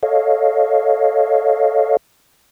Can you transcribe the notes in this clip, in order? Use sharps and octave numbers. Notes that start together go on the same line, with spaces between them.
A4 C#5 D#5 F5